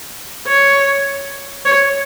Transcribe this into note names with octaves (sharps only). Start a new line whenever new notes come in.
C#5
C#5